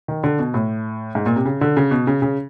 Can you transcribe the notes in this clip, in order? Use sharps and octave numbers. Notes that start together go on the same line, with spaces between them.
D#3
D3
B2
A2
G#2
A#2
C3
C#3
D3
C#3
B2
C#3
C#3